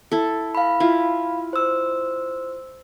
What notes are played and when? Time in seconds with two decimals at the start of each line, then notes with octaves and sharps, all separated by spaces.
0.11 E4 A4
0.55 F5 B5
0.80 E4 F4
1.53 C5 E6